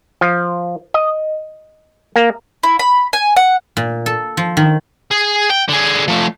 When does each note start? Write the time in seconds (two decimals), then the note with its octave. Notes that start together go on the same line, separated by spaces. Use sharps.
0.21 F3
0.94 D#5
2.16 A#3
2.63 E4
2.79 B5
3.13 G#5
3.36 F#5
3.77 A#2
4.06 A4
4.37 F3
4.57 D#3
5.11 G#4
5.50 G5
5.69 D3 G#4
6.08 F3 A3